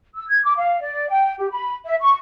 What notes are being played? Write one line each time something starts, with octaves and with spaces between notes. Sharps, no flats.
E6
G#6
D6
F5
D5
G5
G4
B5
E5
C#6